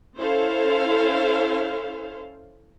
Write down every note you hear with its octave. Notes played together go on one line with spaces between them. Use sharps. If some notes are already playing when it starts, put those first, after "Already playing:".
C#4 E4 A4 C5 F5